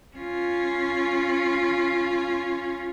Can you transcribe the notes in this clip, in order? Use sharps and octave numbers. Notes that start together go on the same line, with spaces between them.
C#4 F4